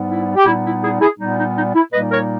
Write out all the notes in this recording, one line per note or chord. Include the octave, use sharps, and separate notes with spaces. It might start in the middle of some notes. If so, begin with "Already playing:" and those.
Already playing: G#2 G3 B3
E4
G4
A#2 G3 B3 D#4 E4
E4
E4 G#4
E4 G#4
A#2 G3 B3 D#4
D#4
D#4
E4
A#2 G3 A#3 D#4 B4 D#5
A#4 C#5